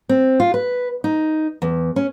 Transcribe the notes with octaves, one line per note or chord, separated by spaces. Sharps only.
C4
F4
B4
D#4
E2
C#4